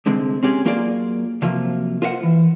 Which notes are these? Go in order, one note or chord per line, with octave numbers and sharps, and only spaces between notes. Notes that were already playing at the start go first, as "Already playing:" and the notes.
C2 D3 G#3 C4
C4 C#4 G4 G#4
F#3 A#3 F4 G#4 A#4 D5
C3 F3 F#3 A#3 F4
F4 A#4 C5 E5 F#5
E3